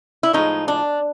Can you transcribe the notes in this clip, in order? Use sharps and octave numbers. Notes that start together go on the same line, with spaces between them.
E4
A2 F3 G#3 D#4
D4